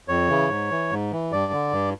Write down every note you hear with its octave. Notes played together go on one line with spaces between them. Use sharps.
F2 C#5
C#3 E3
G#2
E3
G#2
E3
G2 D5
D3
G2